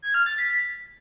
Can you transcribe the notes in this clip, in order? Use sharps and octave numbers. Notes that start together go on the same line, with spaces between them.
G#6
F6
A6
B6